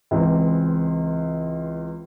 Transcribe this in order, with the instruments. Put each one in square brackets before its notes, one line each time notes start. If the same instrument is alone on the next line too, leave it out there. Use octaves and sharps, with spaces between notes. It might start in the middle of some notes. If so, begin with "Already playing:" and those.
[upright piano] C#2 E3 C4